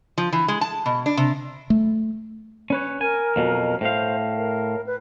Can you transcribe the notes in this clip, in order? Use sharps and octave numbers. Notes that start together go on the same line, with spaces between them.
F3
E3
G#3
A5
B2
D4
C3
A3
C#4 B4 C#5
A#4 G#5
F2 B2 F#3
A2 C5 F5
A#4
B4